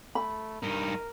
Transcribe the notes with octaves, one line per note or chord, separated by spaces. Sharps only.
A3 B5
G2 D#4 A#4